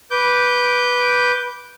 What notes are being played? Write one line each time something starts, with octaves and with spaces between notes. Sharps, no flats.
B4 D6 G6